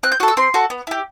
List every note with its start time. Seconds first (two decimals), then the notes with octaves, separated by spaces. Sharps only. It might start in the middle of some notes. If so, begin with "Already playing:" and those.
0.03 C4 F#6
0.12 G6
0.20 F#4 F#6
0.23 A4
0.28 E6
0.37 C4 C6
0.54 F#4 A4
0.70 B3
0.87 E4 G4